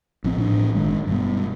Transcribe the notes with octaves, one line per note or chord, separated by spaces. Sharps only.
A1 F3 C4
A1 A2 D4
G1 D#3 G#3
G2 B2